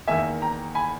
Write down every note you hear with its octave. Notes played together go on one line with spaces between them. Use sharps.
E2 D#3 A#3 E5 G#5
G5 A#5
G#5 B5